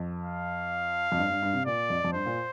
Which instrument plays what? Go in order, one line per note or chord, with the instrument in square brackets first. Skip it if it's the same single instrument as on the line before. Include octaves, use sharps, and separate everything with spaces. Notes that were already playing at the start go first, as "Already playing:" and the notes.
Already playing: [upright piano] F2
[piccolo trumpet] F5
[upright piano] F2
G2
G2
G2
C3
[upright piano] A#2 [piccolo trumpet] D5
[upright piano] F2
F2
[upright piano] G2 [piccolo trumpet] C5
[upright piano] A#2